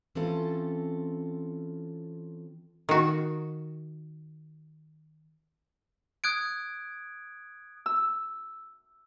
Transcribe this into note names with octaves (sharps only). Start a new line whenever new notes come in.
E3 C4 C#4 F4 A4
D#3 F#4
D#6 F#6 G#6 D7
E6